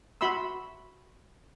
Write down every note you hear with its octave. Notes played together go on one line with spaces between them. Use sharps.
F#4 E5 B5 C6 E6